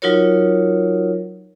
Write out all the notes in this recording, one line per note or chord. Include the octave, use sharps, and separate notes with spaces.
F#3 D#4 F4 F#4 A#4 C#5